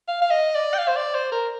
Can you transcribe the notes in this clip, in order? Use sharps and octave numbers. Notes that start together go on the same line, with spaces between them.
F5
F5
D#5
D5
G5
F5
C5
D5
C5
A#4